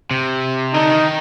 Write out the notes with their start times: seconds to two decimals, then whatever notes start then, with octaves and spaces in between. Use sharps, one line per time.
0.11 C3
0.74 D3 D#4
0.90 D#3